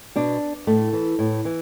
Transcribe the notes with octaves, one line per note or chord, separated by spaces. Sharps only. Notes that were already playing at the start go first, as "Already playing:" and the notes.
B2 D4
A2 A3
E3
A2
E3